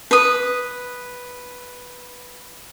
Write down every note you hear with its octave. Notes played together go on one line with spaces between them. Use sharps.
B4 D#6